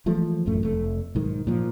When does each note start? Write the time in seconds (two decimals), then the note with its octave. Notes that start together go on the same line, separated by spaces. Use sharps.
0.06 E3 F3 G#3 A3
0.46 E1 A1 F#2 A3
0.63 F1 A3
1.15 B1 G#2 D#3
1.47 A#2 F3